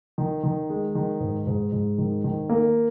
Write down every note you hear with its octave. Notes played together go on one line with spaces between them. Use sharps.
D#3
D#3
G#3
D#3
G#2
G#2
G#2
D#3
D#3
A#3